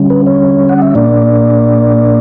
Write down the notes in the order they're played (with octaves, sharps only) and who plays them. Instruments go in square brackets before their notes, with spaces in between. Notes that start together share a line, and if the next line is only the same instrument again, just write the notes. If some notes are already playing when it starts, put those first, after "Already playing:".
Already playing: [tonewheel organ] D3 G3 C#4
B4
C#5
F#5
E5
A#2 A#3 D4 D5